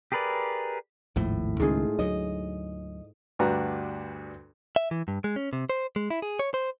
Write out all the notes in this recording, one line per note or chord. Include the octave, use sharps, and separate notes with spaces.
G4 G#4 A#4 B4 D5
G#1 D#2 A2 F3
C#2 G#2 D#3 C#4 F4 G#4
D2 F#3 D#5
D2 G2 D4 F#4 B4 A#5
E5
E3
G2
G#3
C#4
C3
C5
G#3
E4
G#4
C#5
C5